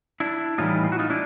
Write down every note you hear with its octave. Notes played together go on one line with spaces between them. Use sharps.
D4 E4
A2 E3 G3 D#4 F4
F4
F#4
D#4 F4
D4 E4